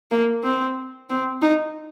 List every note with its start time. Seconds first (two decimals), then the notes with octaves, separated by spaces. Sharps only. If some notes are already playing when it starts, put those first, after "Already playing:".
0.11 A#3
0.44 C4
1.10 C4
1.41 D#4